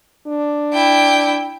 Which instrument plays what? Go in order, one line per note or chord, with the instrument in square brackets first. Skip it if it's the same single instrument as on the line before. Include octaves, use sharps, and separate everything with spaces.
[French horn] D4
[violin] E4 G5